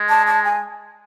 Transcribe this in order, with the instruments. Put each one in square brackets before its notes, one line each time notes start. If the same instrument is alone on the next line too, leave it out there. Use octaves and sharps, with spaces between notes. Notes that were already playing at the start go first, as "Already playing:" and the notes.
Already playing: [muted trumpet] G#3
[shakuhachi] A5
A5
G#5